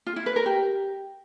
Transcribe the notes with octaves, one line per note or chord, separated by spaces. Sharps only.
F4
E4
B4
A#4
G4